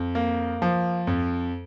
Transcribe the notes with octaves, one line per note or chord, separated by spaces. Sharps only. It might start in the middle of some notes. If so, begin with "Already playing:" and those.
Already playing: F2
A#3
F3
F2